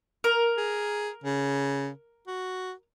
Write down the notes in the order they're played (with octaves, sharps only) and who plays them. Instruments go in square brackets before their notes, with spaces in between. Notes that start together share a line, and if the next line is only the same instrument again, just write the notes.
[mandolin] A#4
[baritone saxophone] G#4
C#3
F#4